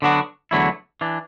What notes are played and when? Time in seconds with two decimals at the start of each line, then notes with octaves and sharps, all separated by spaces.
0.02 D3 F#3 B3 D4 F#4
0.51 E2 D3 F#3 A3 E4
1.01 E3 D4